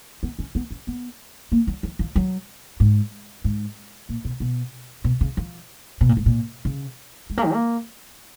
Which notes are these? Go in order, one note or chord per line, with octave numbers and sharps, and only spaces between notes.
B3
C#4
B3
C#4
B3
A#3
F#3
F3
F3
F#3
G#2
G#2
A#2
B2
B2
B2
C#3
F3
B2
A#2
G#2
A#2
C#3
G#3
A#3
D#3
A#3